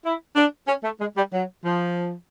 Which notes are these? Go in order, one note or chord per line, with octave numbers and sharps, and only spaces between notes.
E4
D4
C#4
A3
G#3
G3
F#3
F3